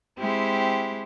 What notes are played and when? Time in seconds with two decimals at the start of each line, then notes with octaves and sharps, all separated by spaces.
0.18 G#3 C4 E4 G4